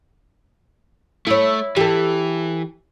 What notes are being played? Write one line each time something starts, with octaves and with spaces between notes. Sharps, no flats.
A3 E4 C#5
E3 G4 A4